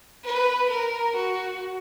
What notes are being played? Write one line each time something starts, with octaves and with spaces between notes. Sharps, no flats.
B4
A#4
F#4